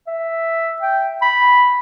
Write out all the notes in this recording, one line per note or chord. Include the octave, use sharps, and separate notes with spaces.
E5
G5
B5